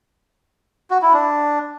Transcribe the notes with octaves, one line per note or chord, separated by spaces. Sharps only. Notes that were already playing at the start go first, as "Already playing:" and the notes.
F#4
E4
D4